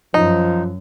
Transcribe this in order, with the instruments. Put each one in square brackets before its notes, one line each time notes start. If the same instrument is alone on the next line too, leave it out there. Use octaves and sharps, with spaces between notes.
[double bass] F#2 [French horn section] F3 [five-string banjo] D#4